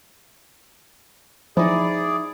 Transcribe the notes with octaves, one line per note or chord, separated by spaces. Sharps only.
F3 D#4 E4 G#4 D5